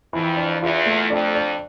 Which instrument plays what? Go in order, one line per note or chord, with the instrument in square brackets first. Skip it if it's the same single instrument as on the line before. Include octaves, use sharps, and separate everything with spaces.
[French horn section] F2 [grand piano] E3
[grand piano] D4
[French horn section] E2 [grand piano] F4
[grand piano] A3
[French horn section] F2 [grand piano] D4
[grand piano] D4